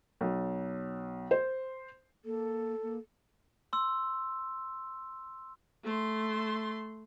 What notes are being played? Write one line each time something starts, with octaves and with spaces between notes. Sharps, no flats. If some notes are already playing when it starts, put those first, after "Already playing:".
B1
C5
A#3 A4
A#3
C6 E6
A3 C6